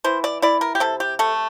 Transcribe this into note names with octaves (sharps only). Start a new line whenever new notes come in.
E3 C5
D5
E4 D5
A#4
G4
C3 A4
G4
A3 A4